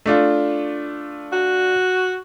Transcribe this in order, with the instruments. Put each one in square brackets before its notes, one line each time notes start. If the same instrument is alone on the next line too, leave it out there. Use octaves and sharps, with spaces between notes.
[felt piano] A3 D4 F4
[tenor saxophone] F#4